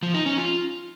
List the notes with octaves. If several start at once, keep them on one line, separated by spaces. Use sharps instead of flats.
F3
D#4
C#4
F4